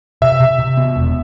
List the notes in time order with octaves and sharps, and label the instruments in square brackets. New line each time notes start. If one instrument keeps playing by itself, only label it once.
[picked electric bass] C3 [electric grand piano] E5
[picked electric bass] C3
C3
B3
E1